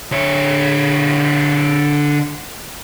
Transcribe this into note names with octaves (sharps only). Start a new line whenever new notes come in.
D3 C#5